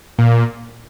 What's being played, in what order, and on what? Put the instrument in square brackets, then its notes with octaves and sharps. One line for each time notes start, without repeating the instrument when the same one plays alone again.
[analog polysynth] A#2